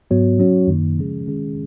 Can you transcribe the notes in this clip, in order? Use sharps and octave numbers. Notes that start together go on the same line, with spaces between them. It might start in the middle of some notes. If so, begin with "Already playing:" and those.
G#2 F#3 B3 F#4 C#5
F#3 C#4 F#4 C#5
F#2 D#3 A#3 D#4
C#3 F3 G#3 C#4 G#4
D#3 G#3 C#4 G#4